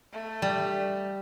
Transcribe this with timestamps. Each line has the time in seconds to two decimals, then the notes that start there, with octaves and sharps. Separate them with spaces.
0.13 A3
0.42 G3